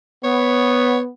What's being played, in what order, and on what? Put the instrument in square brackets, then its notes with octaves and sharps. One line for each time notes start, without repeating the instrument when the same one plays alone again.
[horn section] B3 [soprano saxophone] C#5